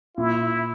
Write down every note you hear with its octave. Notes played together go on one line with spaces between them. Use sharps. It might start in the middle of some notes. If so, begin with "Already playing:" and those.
A#2 E4